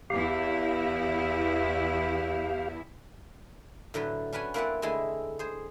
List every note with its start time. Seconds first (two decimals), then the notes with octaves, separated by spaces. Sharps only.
0.10 E2 E4 G4 F5
3.94 A2 D3 F#3 B4
4.33 C#4 D4 B4 F#5 G#5
4.54 A#3 C4 E4 B4 D5 F#5
4.82 D3 G#3 A3 E4 D#5 G#5
5.39 G#4 C5